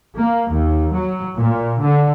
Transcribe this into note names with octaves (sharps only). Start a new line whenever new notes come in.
A#3
D#2
F#3
A#2
D3